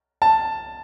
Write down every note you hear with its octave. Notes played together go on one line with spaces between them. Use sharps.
A5